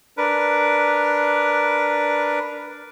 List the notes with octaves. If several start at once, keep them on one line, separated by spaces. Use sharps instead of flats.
D4 A#4 B4